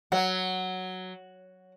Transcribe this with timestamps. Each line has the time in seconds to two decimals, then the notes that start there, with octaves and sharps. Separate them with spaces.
0.12 F#3 F#5